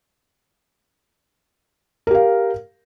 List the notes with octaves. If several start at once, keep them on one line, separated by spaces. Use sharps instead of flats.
G4 A#4 F5